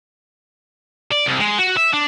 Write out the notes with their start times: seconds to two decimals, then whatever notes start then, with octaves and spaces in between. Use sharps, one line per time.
1.12 D5
1.27 C2
1.41 G#3
1.59 F#4
1.77 E5
1.93 D4